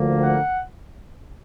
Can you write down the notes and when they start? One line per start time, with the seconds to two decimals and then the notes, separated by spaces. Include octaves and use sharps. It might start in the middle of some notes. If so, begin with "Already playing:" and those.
Already playing: D2 D3 F3 A#3
0.24 F#5